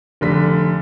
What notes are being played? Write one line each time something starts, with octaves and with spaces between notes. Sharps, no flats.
F1 D3 B6